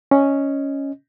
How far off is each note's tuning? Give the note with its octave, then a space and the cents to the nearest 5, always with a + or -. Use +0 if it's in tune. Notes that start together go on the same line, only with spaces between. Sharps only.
C#4 +0 D#5 +0